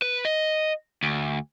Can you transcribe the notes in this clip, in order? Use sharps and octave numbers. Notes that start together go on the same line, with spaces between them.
B4
D#5
D2